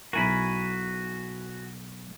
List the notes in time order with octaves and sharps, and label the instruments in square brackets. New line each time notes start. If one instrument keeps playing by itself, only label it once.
[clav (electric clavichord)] B1 E4 A#4 [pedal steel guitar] F#4 G#5 B5